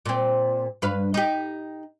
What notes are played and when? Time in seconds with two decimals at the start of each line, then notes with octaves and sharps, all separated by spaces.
0.06 A#2 C4
0.82 G2 B4 F5
1.14 D#4 G4